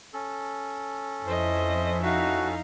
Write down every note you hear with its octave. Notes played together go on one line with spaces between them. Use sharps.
C#4 A4
F2 E4 C5 D#5 E5
D#4 F#4 F5